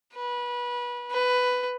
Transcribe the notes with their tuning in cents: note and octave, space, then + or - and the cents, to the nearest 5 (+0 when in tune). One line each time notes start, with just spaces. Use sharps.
B4 -25
B4 +10